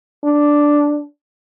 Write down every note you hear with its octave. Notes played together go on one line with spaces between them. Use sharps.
D4